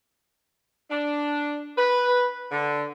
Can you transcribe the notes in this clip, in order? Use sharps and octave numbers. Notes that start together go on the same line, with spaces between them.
D4
B4
D3